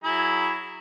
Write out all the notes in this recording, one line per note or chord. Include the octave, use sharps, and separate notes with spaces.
F#3 E4 G#4